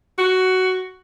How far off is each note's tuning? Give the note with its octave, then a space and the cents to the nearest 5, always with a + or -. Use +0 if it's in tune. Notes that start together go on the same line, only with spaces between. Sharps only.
F#4 +10